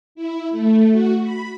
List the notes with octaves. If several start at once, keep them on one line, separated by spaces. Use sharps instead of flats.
E4
A3
F#4
B5